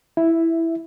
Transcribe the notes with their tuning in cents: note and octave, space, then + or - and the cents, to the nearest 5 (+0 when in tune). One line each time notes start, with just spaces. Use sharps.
E4 +0 E5 +0